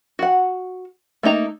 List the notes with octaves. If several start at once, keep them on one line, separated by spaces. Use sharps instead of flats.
F#4 F#5
A3 A#3 D#4 A#5